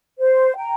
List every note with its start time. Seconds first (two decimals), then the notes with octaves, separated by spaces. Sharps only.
0.20 C5
0.56 G5 A#5